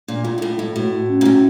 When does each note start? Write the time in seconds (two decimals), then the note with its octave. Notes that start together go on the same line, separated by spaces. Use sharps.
0.08 A#2 D4
0.24 A2 F4
0.38 A#2
0.42 A2 A4
0.58 A2 A3
0.75 A2 F#4
0.92 F#4
1.09 C#4
1.21 A#2
1.25 A2 F#4